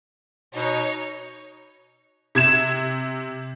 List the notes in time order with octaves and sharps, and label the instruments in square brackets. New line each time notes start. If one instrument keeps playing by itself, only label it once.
[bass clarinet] B2 [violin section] D#4 C#5
[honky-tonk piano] C3 G#6 E7